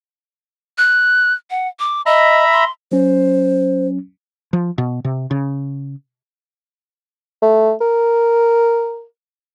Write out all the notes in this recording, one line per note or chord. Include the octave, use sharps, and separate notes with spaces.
F#6
F#5
D6
D#5 E5 A#5 B5
C6
F#3 C#4 C5
F3
B2
C3
C#3
A3
A#4